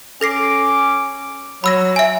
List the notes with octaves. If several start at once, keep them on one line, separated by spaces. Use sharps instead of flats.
C#4 A4 D6 A#6 C7
F#3 B5 E6 A#6
E5 G#5